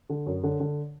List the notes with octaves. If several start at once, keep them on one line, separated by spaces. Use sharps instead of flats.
D3
F#2
D3
D3